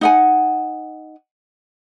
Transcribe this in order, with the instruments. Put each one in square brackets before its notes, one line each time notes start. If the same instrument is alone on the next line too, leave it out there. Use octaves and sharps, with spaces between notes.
[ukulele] D#4 F#5 G#5